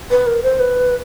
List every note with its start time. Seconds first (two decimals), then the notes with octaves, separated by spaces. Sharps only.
0.11 B4
0.27 A#4
0.43 C5
0.60 B4